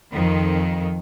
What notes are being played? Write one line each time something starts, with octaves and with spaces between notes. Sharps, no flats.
F2 D#3